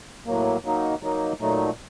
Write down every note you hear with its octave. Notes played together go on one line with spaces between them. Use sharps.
A2 F#3 A#3
F#3 A#3 D#4
F#3 A#3 D#4
A#2 F#3 A3 D#4